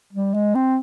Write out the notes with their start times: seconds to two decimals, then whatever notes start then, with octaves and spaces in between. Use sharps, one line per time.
0.13 G3
0.34 G#3
0.55 C4